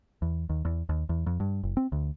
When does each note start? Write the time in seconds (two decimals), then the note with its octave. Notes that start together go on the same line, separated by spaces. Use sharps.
0.22 E2
0.49 D#2
0.65 E2
0.89 D#2
1.09 E2
1.26 F2
1.40 G2
1.63 F#1
1.77 C4
1.92 D2